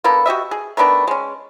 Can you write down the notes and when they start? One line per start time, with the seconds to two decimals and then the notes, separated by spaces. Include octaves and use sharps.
0.04 A#3 B3 D4 A4
0.26 F#4 G4 D#5 E5
0.51 G#4
0.77 D#3 A3 B3 D4
1.07 G#3 C#4